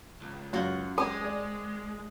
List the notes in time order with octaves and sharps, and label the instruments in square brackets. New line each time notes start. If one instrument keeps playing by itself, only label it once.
[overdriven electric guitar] C#2
[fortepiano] F#2 [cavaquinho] F4 F#4 F#5
[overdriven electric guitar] G#3 [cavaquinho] G4 C5 G#5 [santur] D#6
[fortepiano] G#4 D5